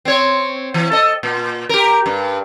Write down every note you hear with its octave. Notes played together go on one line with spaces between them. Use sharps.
C4 C#5
E3
A4 D#5
A#2
G4 A#4
G2